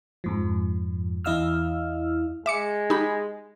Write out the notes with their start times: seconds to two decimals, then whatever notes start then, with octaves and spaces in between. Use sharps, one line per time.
0.24 F2 G#2 F3
1.25 E2 E4 D#5 F5 E6 F6
2.46 G#3 E5 D6 C#7
2.90 D#4 G4 B5